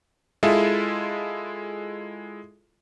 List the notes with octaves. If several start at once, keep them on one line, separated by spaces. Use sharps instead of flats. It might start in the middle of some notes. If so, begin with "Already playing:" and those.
G#3 E4 F4 G#4 A4 E5